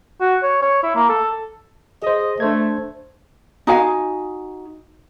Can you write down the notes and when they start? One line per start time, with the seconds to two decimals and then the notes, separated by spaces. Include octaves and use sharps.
0.21 F#4
0.43 C#5
0.62 C#5
0.83 E4
0.95 A#3
1.09 A4
2.02 G#4 C5 D#5
2.40 A3 D4 C5 G#6
3.67 D#4 F#4 F5 G#5